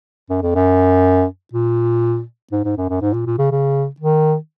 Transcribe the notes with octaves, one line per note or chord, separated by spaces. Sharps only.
F#2
F2
F#2
A#2
G#2
G#2
F#2
F#2
G#2
A#2
A#2
C#3
C#3
D#3